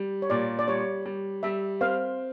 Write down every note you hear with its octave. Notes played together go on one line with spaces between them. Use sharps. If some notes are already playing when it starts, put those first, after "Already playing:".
Already playing: G3
C#5
A#2 D5
D5
G3 C#5
G3
G3 E5
C4 F5